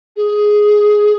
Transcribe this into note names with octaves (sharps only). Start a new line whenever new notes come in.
G#4